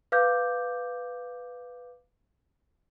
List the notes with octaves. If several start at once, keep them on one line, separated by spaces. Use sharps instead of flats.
B4 F5 D6 G6